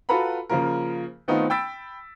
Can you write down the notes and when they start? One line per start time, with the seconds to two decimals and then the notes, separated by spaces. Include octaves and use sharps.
0.09 F4 F#4 A4 B4 A#5 B5
0.49 C#3 F3 A#3 F4 A#4
1.28 D#3 A3 B3 C4 D#4 F4
1.50 G5 B5 E6 A6 B6 D7